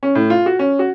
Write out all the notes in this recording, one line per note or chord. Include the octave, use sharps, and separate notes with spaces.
C#4
A2
F4
F#4
C#4
F#4